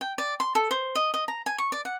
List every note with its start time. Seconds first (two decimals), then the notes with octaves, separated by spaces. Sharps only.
0.01 G5
0.18 D5
0.40 C6
0.55 A4
0.71 C5
0.95 D#5
1.14 D#5
1.28 A#5
1.46 G#5
1.58 C#6
1.72 D5
1.85 F#5